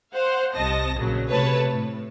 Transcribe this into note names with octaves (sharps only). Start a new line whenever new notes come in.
C5 F5 F#5
C2 C3 D#5 A5 A#6
A#1 A#2 C#3 F#3
C3 A3 B4 C#5 A5
A2